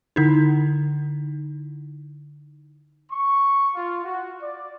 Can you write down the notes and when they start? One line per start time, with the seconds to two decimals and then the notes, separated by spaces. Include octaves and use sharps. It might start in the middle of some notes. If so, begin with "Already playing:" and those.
0.16 D3 D#4 E4
3.12 C#6
3.75 F4
4.05 F#4
4.42 D5